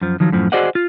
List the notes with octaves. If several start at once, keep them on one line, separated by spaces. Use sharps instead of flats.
F#2 F3
D#3 F3 F#3
F#2 A2 F3
F#4 G#4 C5 D5 D#5 F#5
F4